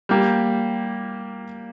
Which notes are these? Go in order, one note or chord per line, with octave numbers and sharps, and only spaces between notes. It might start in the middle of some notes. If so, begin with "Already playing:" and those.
G3 A#3 G4